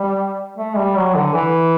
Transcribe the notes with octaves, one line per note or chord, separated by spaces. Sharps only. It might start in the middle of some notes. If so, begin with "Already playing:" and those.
Already playing: G3
A3
G3
F#3
D3
E3